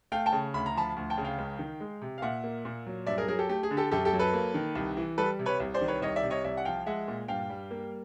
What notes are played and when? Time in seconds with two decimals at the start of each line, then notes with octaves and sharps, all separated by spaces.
0.12 A3 F5 G5
0.26 G5 A5
0.32 C#3
0.54 D2 B5
0.66 A#5
0.75 F3 A5 B5
0.96 D2
1.10 G5 A5
1.18 C#3
1.25 F5 G5
1.38 C#2
1.59 D#3
1.80 G#3
2.02 C3
2.18 F5
2.22 A#2 E5 F#5
2.44 A#3
2.65 A#2
2.87 F#3
3.07 G2 D5 E5
3.18 G#4 A#4
3.28 F#3 G#4 A#4
3.39 G4 A4
3.49 A3 G4
3.63 G#4
3.71 D3
3.77 G4 A4
3.91 F#2 G4 A4
4.05 G4 A4
4.13 F#3
4.19 A4 B4
4.33 A#3
4.54 D#3
4.76 C2
4.97 E3
5.18 G3 A4 B4
5.39 C3
5.46 B4 C#5
5.60 C2
5.74 C5 D5
5.81 D#3
5.88 B4 C#5
6.02 C2 C#5 D#5
6.16 D5 E5
6.23 C3
6.30 C#5 D#5
6.44 C2 D5 E5
6.57 F#5
6.65 F3 F5 G5
6.86 G#3 E5 F#5
7.08 A#2
7.28 G2 F5 G5
7.50 G3
7.71 A#3